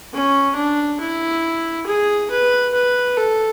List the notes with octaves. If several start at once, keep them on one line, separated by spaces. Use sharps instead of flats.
C#4
D4
E4
G#4
B4
B4
A4